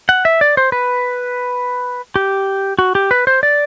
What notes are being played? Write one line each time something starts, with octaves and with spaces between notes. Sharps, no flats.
F#5
E5
D5
C5
B4
G4
F#4
G4
B4
C5
D5